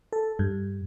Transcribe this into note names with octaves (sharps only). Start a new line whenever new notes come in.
A4
G2